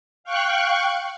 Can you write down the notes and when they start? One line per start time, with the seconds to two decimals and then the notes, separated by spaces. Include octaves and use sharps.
0.24 F5 G5 C#6 F#6